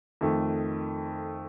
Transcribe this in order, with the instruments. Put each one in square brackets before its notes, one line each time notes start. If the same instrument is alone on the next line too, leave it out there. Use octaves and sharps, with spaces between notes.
[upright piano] F2 D#3 A3